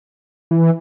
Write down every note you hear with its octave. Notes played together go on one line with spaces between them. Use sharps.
E3